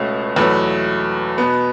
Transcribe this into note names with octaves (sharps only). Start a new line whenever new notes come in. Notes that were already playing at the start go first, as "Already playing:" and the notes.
Already playing: C#2 B2 A3 C#4
E2 B2 F#3 A3 B4
B2 B3